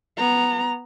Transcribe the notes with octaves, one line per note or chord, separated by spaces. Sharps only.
B3 A#5